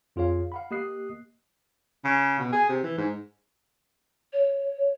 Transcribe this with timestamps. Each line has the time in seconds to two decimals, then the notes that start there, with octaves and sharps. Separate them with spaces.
0.16 F2 F4 G#4 C#5 F5
0.52 F5 F#5 B5
0.71 A#3 G4 D#5 D#6 F#6 C7
2.05 C#3
2.39 B2
2.53 G#4
2.69 C3
2.83 E3
2.98 G#2
4.32 C#5